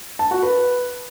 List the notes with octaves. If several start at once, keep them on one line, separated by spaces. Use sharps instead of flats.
A5
F#4
B4